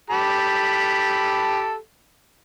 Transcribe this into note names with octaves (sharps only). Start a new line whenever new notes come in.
G4 A4 B5